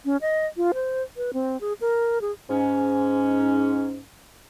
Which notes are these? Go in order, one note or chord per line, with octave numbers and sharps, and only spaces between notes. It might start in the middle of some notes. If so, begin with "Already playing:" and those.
C#4
D#5
F4
C5
B4
C4
G#4
A#4
G#4
G#2 C#4